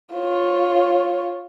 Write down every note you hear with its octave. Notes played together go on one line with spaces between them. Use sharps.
F4 C#5